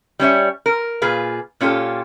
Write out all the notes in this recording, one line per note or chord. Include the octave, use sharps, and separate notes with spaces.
G3 C#4 C#5 E5
A#4
A#2 F4 G#4 B4
A#2 C#4 F4 G4 A4